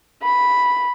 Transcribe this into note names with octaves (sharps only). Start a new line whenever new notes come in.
B5